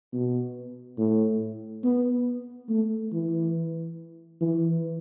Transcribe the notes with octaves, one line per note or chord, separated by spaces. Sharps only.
B2
A2
B3
A3
E3
E3